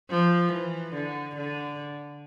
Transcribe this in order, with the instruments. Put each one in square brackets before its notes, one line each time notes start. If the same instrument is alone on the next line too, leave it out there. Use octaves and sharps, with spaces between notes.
[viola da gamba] F3
E3
D3
D3